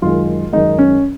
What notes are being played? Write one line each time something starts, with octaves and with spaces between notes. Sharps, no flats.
F#2 D#3 G#3 F4
F#2 D#3 G#3 D#4
C#4